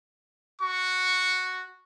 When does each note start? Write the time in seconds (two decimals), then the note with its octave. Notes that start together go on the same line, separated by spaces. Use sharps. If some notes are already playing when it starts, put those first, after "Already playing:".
0.62 F#4 C#6